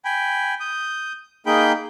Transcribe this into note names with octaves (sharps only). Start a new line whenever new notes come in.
G5 G#5 B5
D#6 G6
A#3 D#4 G#4 G5 B5 G6